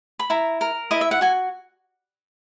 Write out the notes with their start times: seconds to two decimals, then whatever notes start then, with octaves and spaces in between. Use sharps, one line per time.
0.19 B5
0.30 E4 A#5
0.61 A#4
0.91 E4 D#5
1.01 E5
1.11 F#5
1.21 F#4 G#5